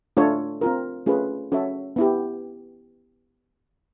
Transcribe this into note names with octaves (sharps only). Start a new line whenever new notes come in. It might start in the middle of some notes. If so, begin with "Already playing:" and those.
A3 D4 F4 A4 C#5
C4 F4 A#4
A3 C#4 F4 G#4 B4
C#4 F#4 A4 C#5 E5
B3 E4 G4